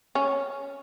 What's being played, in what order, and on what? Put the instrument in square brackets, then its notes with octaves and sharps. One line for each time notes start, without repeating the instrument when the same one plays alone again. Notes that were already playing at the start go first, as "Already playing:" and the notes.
[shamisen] C#4